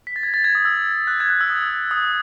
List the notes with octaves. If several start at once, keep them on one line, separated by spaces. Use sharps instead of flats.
B6
A6
G#6
A6
G#6
D#6
E6
F#6
G#6
F#6
E6
D#6
D#6